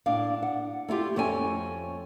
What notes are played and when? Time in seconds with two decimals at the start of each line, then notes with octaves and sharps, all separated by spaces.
0.06 A2 D4 F5
0.42 F#5
0.88 A3 E4 F4 G4
1.16 F2 A3 C#4 G5 G#5